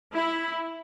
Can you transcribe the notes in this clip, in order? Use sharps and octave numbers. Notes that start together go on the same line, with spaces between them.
E4